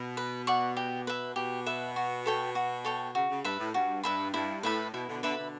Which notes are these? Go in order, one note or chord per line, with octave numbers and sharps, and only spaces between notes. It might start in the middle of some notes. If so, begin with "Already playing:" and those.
Already playing: B2
B4
D5 F#5 C#6
G4
B4 E5
B2 G4
B4 E5
F#4
A4 C#5 G5
F#4
A4 C#5 G5
C#3 F#4
C#3
G2 B4 E5 B5
A2
G2 F#4
G2 B4 E5 B5
G2 E4
A2 B4 E5 B5
B2 E4
B2 D3
B2 D3 B4 E5 B5
B2 D3